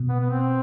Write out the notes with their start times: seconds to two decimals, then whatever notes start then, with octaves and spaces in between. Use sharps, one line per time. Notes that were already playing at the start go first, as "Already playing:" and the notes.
Already playing: B2
0.09 B3
0.20 B3
0.30 C4